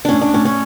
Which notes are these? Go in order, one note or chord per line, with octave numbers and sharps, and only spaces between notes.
A2 C#4 D4
D4
A2 C#4
C#4